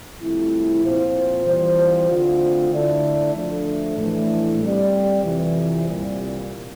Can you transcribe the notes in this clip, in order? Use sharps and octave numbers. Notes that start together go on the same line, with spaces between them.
C2 C3 F3 A3 E4
A#2 F3 C4 F4 C5
E3 G3 C4 F4 C5
D2 D3 A3 C4 F4
D3 A3 E4 A4 D5
F3 A3 D4 A4
A2 E3 A3 D4
G3 C4 G4 D5
F2 C3 E3
C2 A#2 G3